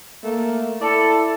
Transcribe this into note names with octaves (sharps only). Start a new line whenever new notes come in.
A3 A#3
E4 A4 D5